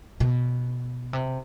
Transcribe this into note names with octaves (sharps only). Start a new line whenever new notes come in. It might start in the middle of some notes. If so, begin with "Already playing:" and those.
B2
C3